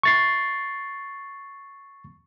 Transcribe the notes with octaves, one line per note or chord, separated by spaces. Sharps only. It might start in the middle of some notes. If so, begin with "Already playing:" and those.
C#6 A6 C7